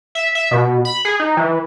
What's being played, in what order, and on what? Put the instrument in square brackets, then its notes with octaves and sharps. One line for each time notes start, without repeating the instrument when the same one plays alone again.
[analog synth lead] E5
E5
B2
B5
G#4
D#4
E3